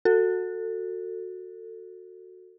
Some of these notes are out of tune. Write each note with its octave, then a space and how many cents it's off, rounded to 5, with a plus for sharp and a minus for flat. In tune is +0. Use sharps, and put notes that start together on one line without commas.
F#4 -10 A4 +25